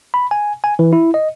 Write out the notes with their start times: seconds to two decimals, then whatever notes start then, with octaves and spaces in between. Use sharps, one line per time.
0.14 B5
0.31 G#5
0.64 G#5
0.79 E3
0.93 E4
1.14 D#5